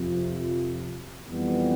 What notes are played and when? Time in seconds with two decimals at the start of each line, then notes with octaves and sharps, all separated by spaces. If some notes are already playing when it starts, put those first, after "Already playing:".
Already playing: F2 C3 F3
1.27 F2 E3 G3 B3